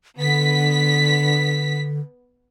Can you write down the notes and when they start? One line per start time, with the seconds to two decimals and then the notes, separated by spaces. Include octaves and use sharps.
0.17 D3 B3 B6